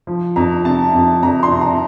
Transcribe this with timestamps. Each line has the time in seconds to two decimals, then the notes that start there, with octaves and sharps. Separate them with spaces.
0.07 F3
0.36 F2 A#5
0.65 C3 A5
0.95 F2
1.23 F2 A#5
1.43 C6
1.52 C3
1.61 A#5